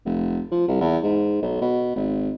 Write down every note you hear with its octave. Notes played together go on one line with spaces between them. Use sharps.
F1
F3
C2
E2
G#2
B1
B2
G#1